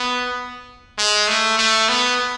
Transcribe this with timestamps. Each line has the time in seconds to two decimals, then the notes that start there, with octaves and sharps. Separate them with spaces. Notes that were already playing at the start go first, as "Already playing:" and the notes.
Already playing: B3
0.98 G#3
1.28 A3
1.58 A3
1.89 B3